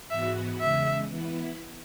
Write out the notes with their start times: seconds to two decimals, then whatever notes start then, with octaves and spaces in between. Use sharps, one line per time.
0.10 G#2 E3 B3 F#4 E5
0.60 E2 C#3 G#3 E5
1.09 E3 B3 E4